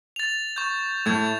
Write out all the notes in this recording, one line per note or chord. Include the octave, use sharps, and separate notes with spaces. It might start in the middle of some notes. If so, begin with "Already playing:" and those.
A6 F7
C#6 G6
A2 A3 G6 G#6